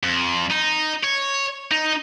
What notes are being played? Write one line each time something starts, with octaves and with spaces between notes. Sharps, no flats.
F2
D#4
C#5
D#4